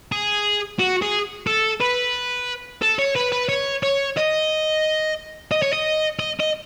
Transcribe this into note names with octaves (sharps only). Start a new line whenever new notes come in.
G#4
F#4
G#4
A4
B4
A4
C#5
B4
B4
C#5
C#5
D#5
D#5
C#5
D#5
D#5
D#5